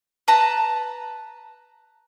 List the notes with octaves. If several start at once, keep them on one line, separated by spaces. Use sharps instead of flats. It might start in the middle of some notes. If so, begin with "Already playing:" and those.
B4 A5 A#5